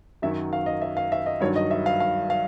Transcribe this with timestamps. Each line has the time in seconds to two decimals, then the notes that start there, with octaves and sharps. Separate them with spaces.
0.22 F#2 D#3 F#3 E5
0.53 F5
0.66 D#5
0.82 E5
0.97 F5
1.12 E5
1.26 D#5
1.41 G2 D#3 F#3 C#5
1.56 D#5
1.71 E5
1.86 F5
2.00 F5
2.30 F5